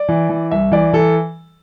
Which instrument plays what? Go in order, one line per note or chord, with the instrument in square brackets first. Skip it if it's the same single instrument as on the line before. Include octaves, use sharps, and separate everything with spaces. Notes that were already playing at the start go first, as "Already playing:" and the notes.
Already playing: [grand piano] D5
E3
E3
C2 E5
E3 D5
E3 A4